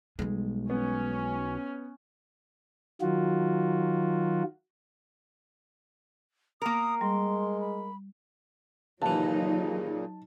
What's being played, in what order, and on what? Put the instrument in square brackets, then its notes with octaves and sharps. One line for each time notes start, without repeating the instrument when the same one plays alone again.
[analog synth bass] B1 [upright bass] G3 G#3
[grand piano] B3 [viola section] C#4
[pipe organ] D#3 F#3 F4 F#4
[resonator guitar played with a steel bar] A#3 A#4 [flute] D#6
[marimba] G3 [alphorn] G#3 [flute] C6
[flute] B5
[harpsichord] D#2 E3 [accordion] A#2 C#3 [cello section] F#3 D#4 [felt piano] A5